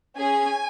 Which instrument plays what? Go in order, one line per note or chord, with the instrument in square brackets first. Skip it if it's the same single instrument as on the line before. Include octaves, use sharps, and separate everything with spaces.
[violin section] C#4 G#4 G#5